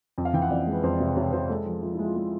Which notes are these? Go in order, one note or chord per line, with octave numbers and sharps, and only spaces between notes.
F2
F5
E3 G5
F#5
F2 D5
G#3
B4
F2 C5
C3
C3 C#5
B4
C3 C5
G#3 A4
F3
F3 F4
G#3 E4
F4
G#3